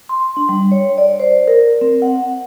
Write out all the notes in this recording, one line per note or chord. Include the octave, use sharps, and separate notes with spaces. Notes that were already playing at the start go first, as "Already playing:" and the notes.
C6
D4
G3
C#5
D5
C5
A#4
C4
F#5